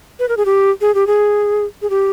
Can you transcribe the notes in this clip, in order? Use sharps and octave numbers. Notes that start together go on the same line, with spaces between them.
B4
A#4
G#4
G4
G#4
G4
G#4
G#4
G4